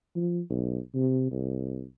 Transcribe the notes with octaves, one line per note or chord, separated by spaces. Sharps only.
F3
B1
C3
C2